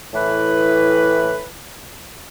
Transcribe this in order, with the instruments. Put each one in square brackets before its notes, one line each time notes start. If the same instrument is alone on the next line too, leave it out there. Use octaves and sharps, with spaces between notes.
[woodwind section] A2 E3 B4